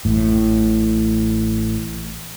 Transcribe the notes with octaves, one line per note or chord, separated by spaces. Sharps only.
A1 A2